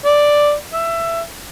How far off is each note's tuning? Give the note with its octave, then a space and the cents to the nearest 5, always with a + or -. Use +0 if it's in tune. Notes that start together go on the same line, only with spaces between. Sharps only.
D5 +0
E5 +20